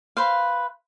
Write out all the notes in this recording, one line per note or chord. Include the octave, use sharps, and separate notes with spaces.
B4 C5 F5